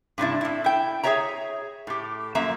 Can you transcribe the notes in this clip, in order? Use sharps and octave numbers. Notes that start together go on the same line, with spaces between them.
G2 C3 D4 E4
A2 E4
E4 G5
G#4 A4 C#5 E5 A#5
A2 G4
F#2 F3 A#3 E5 A#5